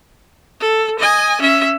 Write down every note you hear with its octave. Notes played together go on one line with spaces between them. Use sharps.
A4
D#5 G#5
C#4 E5